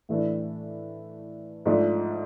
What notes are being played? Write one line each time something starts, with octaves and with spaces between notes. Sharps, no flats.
A2 E3 A3 D4
G#2 F3 A3 D4